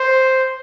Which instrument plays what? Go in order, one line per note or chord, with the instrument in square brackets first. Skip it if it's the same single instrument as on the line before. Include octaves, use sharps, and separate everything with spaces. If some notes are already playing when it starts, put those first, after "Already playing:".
Already playing: [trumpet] C5